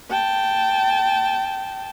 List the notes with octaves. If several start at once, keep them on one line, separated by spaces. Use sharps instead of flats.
G5 A5